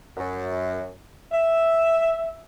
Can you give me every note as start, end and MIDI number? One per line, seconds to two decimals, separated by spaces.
0.17 0.89 42
1.32 2.40 76